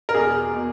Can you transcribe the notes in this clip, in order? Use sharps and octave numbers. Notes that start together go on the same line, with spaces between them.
A#4
E2 B2 G#4
B2